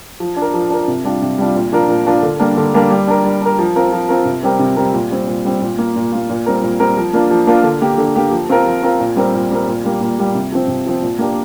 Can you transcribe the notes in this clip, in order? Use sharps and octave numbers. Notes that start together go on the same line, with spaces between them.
F3
D4
A#4
F3
D4 A#4
C3
G3 D4 F4
C3
G3 D4 F4
A#2
F3 D4 F4 A#4
A#2
F3 D4 F4 A#4
D3
G3 A#3 D4 A#4
D3
G3 A#3 D4 A#4
G3
D4 A#4
G3
D4 A#4
F3
C4 F4 A#4
F3
C4 F4 A#4
C3
G3 C4 G4 A#4
C3
G3 C4 G4 A#4
A#2
G3 C4
A#2
G3 C4
A#2
A#3 F4
A#2
A#3 F4
A#2
G3 C4 A#4
A#2
G3 C4 A#4
F3
A#3 D4 F4 A#4
F3
A#3 D4 F4 A#4
D3
A#3 G4
D3
A#3 G4
F3
C4 F4 A#4
F3
C4 F4 A#4
A#2
G3 C4 A#4
A#2
G3 C4 A#4
A#2
G3 A#3 G4
A#2
G3 A#3 G4
C3
F3 C4
C3
F3 C4
A#2
A#3 D4 G4 A#4